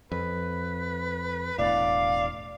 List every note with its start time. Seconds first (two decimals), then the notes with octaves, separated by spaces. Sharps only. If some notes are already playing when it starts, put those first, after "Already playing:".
0.12 F2 B4
1.58 E1 A2 D5 F5